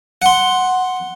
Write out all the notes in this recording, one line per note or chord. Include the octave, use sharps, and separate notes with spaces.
F#5 C6